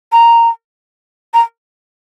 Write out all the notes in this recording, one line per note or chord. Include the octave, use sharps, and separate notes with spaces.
A#5
A#5